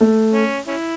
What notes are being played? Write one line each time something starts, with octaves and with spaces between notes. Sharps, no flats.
A3
C#4
C#4 E4